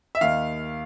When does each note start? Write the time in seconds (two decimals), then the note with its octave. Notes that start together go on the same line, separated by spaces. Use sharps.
0.15 E5
0.21 D#2 D#3 F5